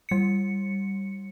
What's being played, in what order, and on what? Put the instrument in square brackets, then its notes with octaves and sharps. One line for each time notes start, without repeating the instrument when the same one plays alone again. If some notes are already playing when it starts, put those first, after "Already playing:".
[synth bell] G3 C#7